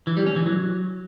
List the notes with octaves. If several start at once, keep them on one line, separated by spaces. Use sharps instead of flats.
E3
G3
C#4
E3
F#3